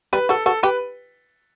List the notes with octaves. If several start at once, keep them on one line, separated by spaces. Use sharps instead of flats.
G3 B4
F#4 A4
F#4 A4
G4 B4